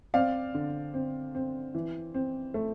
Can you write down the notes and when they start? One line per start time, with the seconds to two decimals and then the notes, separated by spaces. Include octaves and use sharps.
0.14 C4 D5 F5
0.54 D3
0.94 C4
1.35 C4
1.75 E3
2.14 C4
2.54 A3